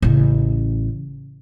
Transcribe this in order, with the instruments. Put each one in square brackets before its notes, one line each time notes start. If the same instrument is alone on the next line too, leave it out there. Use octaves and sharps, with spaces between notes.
[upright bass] A1 C#3